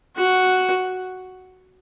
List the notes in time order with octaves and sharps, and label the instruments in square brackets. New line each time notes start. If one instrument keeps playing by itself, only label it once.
[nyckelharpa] F#4